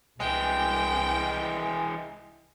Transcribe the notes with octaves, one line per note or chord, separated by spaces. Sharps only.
C2 E3 G#3 G5